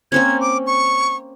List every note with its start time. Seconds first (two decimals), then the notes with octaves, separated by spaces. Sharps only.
0.12 A#3 C4 C#4 G#6
0.40 D6
0.66 C#6